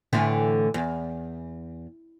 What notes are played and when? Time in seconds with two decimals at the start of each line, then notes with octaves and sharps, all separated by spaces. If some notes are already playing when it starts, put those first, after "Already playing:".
0.13 A2 D3 E3
0.74 E2